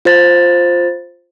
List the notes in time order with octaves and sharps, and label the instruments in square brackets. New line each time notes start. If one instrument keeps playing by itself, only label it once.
[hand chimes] F4 C5 A6